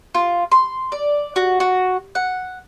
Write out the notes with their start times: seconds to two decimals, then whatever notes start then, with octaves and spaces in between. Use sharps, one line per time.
0.15 F4
0.52 C6
0.92 D5
1.36 F#4
1.60 F#4
2.15 F#5